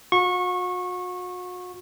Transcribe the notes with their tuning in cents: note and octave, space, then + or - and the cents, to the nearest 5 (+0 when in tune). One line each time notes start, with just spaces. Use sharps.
F#4 -45 C#6 -20